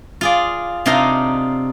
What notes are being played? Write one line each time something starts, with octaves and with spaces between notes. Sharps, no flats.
F4 G#4 D5
C3 D4 D#4 F4 F5 A#5